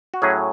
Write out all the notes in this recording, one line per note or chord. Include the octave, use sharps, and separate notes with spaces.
F#4
A2 F#3 C#4 G#4